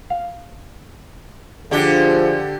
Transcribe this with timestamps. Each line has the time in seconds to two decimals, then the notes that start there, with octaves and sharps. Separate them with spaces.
0.10 F5
1.71 D3 F3 D4 G4 G#4 D5